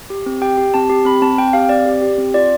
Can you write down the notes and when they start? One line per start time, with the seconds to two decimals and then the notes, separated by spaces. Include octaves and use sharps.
0.10 G4
0.26 C4
0.41 G4 G5
0.58 G4
0.74 C4 A5
0.90 G4
1.05 C4 B5
1.22 C4 A5
1.38 C4 G5
1.53 G4 F5
1.69 C4 D5
1.86 G4
2.02 G4
2.18 C4
2.34 F4 D5